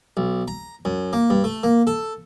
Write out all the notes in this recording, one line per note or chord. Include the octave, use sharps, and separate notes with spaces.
B1
A#5
F#2
A#3
G2
A3
A#3
A4